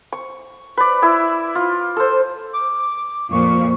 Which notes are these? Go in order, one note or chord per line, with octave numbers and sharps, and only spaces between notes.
C#6
B4 D5
E4 E5 E6
F4
A4 C5
D6
F2 A#2 C#6